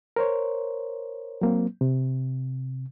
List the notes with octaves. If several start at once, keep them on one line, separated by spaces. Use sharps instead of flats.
A#4 C5 C#5
F#3 A#3 C4
C3